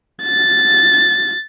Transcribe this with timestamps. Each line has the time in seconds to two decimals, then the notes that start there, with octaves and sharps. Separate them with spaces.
0.24 A6